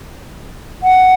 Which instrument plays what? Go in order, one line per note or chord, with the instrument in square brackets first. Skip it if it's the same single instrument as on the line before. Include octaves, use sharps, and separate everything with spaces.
[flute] F#5